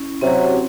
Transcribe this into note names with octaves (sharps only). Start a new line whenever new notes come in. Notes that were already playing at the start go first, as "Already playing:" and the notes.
Already playing: C#4 E4
C3 F#3 C4